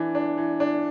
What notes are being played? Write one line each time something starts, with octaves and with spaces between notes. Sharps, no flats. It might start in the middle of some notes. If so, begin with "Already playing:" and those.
Already playing: E3 D4
D4
E3
D4